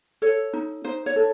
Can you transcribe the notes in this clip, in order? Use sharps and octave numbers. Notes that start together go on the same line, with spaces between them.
A4 C#5
D#4
D#4 C5
C#5
A4